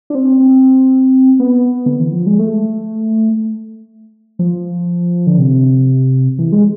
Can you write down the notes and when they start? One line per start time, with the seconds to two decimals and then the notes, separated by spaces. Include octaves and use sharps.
0.10 D4
0.15 C4
0.40 C4
1.39 B3
1.86 D3
1.99 E3
2.13 F3
2.26 G#3
2.39 A3
4.39 F3
5.27 D3
5.38 C3
6.39 E3
6.52 G#3